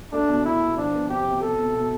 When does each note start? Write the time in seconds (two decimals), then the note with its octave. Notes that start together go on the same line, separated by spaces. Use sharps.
0.12 A3 D4
0.28 B2
0.45 E2 E4
0.60 B2
0.77 F3 D4
0.93 B3
1.09 C3 G4
1.25 C3
1.41 B2 A4
1.58 B2
1.74 B2